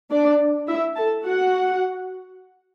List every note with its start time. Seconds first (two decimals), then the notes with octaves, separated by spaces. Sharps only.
0.11 D4 D5
0.68 E4 E5
0.96 A4 A5
1.25 F#4 F#5